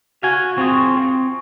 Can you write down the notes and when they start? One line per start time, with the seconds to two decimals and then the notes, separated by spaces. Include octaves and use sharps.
0.23 F#4 F5 G#5
0.58 C4 F4 G#4 C#6
0.97 C4